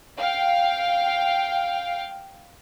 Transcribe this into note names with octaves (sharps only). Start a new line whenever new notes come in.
F5 G5